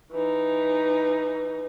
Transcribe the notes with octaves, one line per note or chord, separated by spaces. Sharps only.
E3 D#4